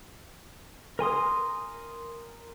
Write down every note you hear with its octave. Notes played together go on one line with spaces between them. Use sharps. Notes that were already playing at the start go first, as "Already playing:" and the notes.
A#4 G#5 C6 D#6